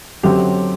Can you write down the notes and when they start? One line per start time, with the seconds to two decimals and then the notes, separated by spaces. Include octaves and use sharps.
0.23 F#2 D3 F#3 C4 G4